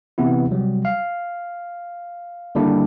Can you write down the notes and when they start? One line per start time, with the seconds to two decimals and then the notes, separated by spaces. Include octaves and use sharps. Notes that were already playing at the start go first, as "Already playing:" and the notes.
0.18 C3 E3 B3 E4
0.51 C3 F#3 G3
0.85 F5
2.55 D3 D#3 G3 A#3 D4 E4